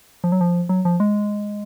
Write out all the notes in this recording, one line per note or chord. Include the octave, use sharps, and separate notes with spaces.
F3
F#3
F3
F#3
F3
G#3